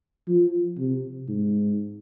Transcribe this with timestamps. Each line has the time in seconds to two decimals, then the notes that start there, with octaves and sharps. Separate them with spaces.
0.28 F3
0.78 C3
1.28 G#2